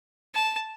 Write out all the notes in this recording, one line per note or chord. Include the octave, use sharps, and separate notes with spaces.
A5